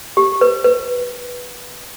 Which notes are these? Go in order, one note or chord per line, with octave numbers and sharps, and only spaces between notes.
G4
B4
B4